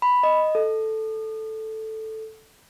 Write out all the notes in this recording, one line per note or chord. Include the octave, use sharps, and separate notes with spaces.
B5
D#5
A4